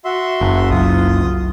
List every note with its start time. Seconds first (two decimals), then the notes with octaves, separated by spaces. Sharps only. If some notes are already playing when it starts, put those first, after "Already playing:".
0.05 F#4 E5 C6
0.41 F#1
0.70 C2 C#3 F#3 F4 D#6